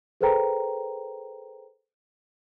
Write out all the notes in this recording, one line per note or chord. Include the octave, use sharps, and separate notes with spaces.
G#4 A4 B4 C5 G5 A#5